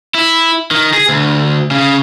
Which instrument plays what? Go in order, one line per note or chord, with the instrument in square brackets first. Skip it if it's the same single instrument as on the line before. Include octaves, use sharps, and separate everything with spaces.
[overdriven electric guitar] E4
D#3
G#4
D2
C#3